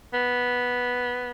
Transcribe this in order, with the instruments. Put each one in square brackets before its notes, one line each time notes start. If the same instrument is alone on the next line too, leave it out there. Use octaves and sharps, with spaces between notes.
[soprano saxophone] B3